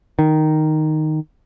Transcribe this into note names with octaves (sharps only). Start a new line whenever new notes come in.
D#3